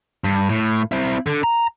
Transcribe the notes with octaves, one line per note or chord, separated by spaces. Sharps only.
G2
A2
C4 E4
D3
A#5